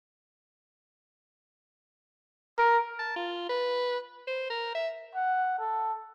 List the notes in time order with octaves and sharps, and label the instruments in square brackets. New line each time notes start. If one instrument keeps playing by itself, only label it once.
[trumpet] A#4
[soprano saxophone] A5
F4
B4
C5
A#4
E5
[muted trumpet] F#5
A4